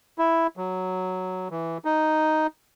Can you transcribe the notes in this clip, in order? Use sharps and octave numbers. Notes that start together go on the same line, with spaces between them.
E4
F#3
E3
D#4